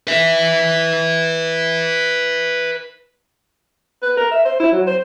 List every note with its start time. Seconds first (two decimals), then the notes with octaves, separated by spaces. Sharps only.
0.07 B4 E5
4.02 B4
4.17 A#4
4.31 E5
4.45 C5
4.60 E4
4.72 F#3
4.87 C5